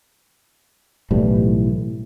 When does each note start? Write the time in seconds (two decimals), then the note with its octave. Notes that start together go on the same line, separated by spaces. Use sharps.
1.11 B1 A2 E3 G3